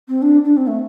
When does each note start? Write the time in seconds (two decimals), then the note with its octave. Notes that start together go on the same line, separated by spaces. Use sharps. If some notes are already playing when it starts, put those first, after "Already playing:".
0.08 C4
0.22 D4
0.44 D4
0.57 C4
0.67 A3